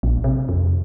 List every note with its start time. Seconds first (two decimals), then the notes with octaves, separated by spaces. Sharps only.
0.03 A#1
0.24 C3
0.49 F2